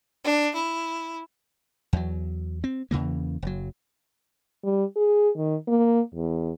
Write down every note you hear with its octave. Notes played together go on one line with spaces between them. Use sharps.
D4
E4
E2 F#3
C4
E2 C#3 E3 A#3
F#1 F#3
G3
G#4
D#3
A#3
E2